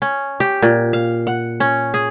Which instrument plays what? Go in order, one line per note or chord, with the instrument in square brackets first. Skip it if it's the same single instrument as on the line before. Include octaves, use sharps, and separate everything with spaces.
[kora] C#4
G4
A#2
F5
F#5
C#4
G#4